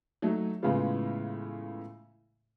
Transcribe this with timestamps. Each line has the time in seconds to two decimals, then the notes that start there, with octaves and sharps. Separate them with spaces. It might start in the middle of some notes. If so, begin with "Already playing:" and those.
0.22 F#3 A3 D#4
0.62 A2 C#3 E3 G#3 B3 F4